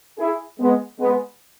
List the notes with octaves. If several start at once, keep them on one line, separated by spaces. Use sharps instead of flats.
E4 G#4
G#3 B3
G#3 B3